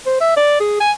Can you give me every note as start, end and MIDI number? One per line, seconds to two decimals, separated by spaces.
0.06 0.17 72
0.21 0.35 76
0.37 0.60 74
0.60 0.80 68
0.80 0.92 80